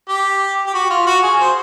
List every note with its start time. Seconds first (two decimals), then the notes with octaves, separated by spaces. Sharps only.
0.09 G4
0.67 G4
0.74 F#4
0.90 F4
1.07 F#4
1.23 G#4
1.39 C5